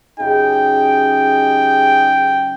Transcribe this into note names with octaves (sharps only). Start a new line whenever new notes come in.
F#2 C#3 D#4 G4 G#4 G5